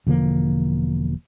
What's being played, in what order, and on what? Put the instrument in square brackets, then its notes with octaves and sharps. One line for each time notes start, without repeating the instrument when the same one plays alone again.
[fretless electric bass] E1 D3 F3 A#3